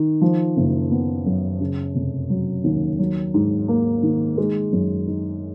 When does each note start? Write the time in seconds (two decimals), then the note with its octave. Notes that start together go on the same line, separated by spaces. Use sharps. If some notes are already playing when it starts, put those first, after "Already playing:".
Already playing: D#3
0.21 F3
0.56 F#1
0.91 B3
1.26 F#2
1.60 C#3
1.95 F1
2.30 F#3
2.64 D#2
2.99 F#3
3.34 G#2
3.68 A#3
4.03 D#3
4.37 G#3
4.72 F#2
5.07 D#4